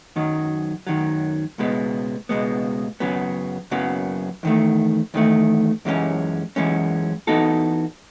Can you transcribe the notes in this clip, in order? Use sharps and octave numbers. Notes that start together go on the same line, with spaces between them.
F#2 D#3 F#3
F#2 D#3 F#3
C#2 B2 G#3 B3
C#2 B2 G#3 B3
F#2 C#3 F#3 B3
F#2 C#3 F#3 B3
E2 D#3 A3
E2 D#3 A3
F#2 E3 G#3 C#4
F#2 E3 G#3 C#4
E3 B3 D#4 F#4 A4